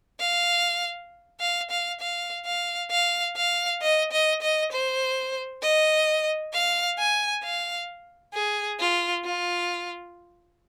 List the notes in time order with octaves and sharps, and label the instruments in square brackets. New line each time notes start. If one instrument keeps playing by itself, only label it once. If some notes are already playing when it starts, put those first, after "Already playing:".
[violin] F5
F5
F5
F5
F5
F5
F5
D#5
D#5
D#5
C5
D#5
F5
G#5
F5
G#4
F4
F4